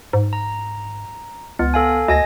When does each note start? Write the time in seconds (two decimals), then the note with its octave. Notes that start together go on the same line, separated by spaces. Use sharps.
0.13 G#2
0.33 A#5
1.59 C#2 B3
1.74 A4 F5 G#5
2.08 D2 D#5 G#5 A#6